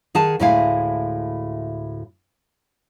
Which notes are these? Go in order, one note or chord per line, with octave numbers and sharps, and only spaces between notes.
D#3 G#4 F#5 A5
D2 A2 G#3 E4 F5 G#5